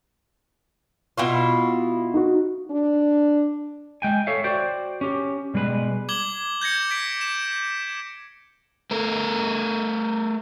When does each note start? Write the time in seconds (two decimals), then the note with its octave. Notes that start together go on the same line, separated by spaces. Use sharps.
1.18 B2 E4 F4 C#6
2.14 D#4 F#4
2.70 D4
4.02 G#3 G5 G#5
4.27 A4 C#5 E5 F5
4.44 F#4 C5 D5 G5
5.01 C#4 G4
5.54 B2 G3 G#3 B4
6.09 D6 G#6 F#7 G7
6.61 G6 G#6 A#6 C#7
6.91 G#6 B6 D7
7.21 E7
8.91 A3 A#4